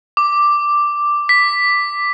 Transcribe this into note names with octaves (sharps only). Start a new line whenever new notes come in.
D6
B6